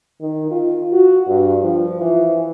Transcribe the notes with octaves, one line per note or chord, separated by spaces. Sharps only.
D#3
F4
F#4
G2
F3
E3